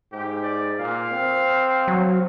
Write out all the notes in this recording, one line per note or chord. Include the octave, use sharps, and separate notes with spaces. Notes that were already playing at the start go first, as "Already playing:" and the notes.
G#2 G4
D5
A#2 F5
C4
F#3